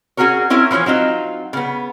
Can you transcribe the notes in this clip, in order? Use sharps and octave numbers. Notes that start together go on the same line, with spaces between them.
C#4 F#4 G#4 A#4 C#5
C4 C#4 E4 A#4
E3 F3 C#4 C#5 G#5
F#3 C4 D#4 F4
C#3 B3